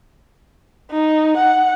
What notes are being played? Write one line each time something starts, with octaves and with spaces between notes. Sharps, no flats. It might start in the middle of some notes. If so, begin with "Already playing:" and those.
D#4
F#5